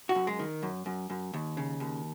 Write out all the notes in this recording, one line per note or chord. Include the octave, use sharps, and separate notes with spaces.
F#4
F#2
G#3
D#3
F#2
F#2
F#2
D#2
C#3
D#2